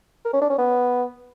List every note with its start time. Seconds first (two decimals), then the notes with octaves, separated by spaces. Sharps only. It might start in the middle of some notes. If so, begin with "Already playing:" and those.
0.25 A#4
0.33 C#4
0.42 D4
0.50 C#4
0.58 B3